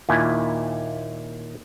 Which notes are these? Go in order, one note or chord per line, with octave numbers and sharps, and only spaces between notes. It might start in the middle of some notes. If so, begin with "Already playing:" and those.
D#2 A#2 E4 G#5